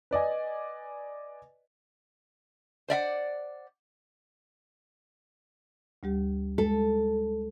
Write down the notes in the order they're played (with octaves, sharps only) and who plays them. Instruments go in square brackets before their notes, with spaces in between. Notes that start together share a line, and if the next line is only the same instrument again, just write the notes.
[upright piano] B4 D5 D#5 G#5
[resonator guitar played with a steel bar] C5 D5 E5 F#5
[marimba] D2 G3 G4
[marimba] G#3 [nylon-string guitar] A4